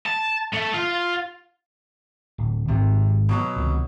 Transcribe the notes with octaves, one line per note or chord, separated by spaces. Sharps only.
A5
A3
F4
D1
G#1 G#2 C3
B2 F#3
C#2 C3 D#3